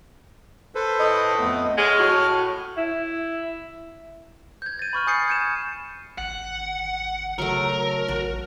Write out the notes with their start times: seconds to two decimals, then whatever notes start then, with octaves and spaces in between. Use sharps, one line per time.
0.75 A4 B4 C5
1.00 A2 D#5
1.39 F2 A3 B3
1.78 G#3 C#5 F6
2.00 A2 F#4
2.77 E4
4.62 G6 G#6
4.79 A6 D#7
4.93 B5 C#6 F6 D#7
5.07 G#5 D#6 G6 A6 C7 C#7
5.28 G6 G#6 C#7 D#7 E7
6.18 G#1 F#5
7.39 C#3 F#3 A3 A#4
8.08 A1 F#4